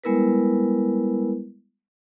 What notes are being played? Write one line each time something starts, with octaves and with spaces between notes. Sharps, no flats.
G3 G#3 B3 E4 A#4 B4